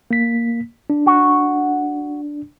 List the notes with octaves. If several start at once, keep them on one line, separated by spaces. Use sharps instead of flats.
A#3 B6
D4
F#4